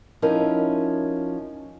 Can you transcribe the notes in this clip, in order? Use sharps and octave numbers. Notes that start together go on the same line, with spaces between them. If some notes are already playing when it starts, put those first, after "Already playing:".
F3 C#4 D#4 E4 A#4